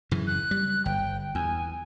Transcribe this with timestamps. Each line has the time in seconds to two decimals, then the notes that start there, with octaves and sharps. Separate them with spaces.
0.11 F#2 C#3 E3
0.27 F#6
0.51 G3
0.86 G1 G5
1.35 E2 G#5